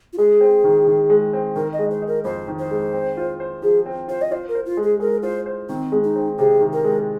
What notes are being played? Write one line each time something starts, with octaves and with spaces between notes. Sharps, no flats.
F4
G#3 G#4
C4
D#3
D#3
G#3
C4
D#3 A#4
D#5
G#3
C5
D#4
A#4
F2 C5
D#3
C5
G#3
C4
F4
C5
F3 G#4
C4
F4 C5
D#5
F4 C5
A#4
C5
F4
G#3
G#4
G#3 A#4
F4 C5
C5
D#3 C4
G#3
D#4
C4
C3 G#4
D#3
A#4
G#3